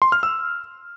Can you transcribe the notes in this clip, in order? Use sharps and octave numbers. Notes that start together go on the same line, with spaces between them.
C6
F6
E6